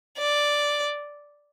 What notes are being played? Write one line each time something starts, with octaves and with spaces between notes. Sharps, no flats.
D5